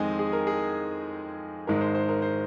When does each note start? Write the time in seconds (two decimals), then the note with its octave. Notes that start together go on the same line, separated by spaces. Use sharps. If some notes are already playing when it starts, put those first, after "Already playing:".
Already playing: F2 D#3 G#3 C4 D#5 G#5
0.19 G#4
0.33 A#4
0.47 G#4
1.67 G#1 G#2 G#3 A#4
1.81 C5
1.94 C5
2.09 A#4
2.22 C5